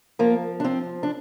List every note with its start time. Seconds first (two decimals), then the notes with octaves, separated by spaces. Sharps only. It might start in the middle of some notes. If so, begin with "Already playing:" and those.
0.19 F3 A#3
0.60 D4
0.64 F3 C4
1.03 D4